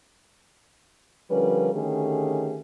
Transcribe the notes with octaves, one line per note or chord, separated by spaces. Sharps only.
D3 F3 G3 C#4 A#4 B4
D3 D#3 A3 C#4 G4 G#4